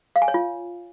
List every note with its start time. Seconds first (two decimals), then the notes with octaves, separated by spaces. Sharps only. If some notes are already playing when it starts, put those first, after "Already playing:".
0.16 F5
0.22 G#5
0.28 C#5
0.34 F4